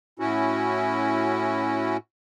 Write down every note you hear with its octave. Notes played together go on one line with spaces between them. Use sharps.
A2 C#4 E4 F#4